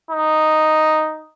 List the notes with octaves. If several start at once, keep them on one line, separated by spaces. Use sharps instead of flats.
D#4